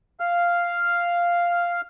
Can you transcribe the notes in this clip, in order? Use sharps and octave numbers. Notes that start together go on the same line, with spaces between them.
F5 F6